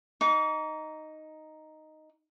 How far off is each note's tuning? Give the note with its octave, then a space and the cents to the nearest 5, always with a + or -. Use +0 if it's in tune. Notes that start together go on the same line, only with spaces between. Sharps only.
D#4 +0 D6 -45